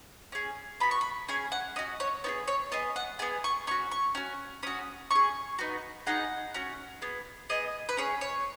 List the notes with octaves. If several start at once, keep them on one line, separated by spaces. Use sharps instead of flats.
C#4 G#4
B3 F#4 B5
C#6
B5
C#4 G#4 G#5
F#5
C#4 F#4 D#5
C#5
B3 D#4 G#4 C#5
C#5
B3 G#4 D#5
F#5
B3 G#4 G#5
C#6
C#4 F#4 C#6
C#6
C#4 F#4
C#4 F#4 D#6
C#4 G#4 C#6
B3 D#4 F#4
B3 D#4 G#4 F#5
C#4 F#4
B3 G#4
B3 G#4 D#5
B4
C#4 G#4 C#5
C#5